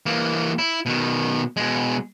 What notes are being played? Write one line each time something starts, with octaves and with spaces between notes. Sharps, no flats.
E3 A#3
E4
B2 D#3
B2 G#3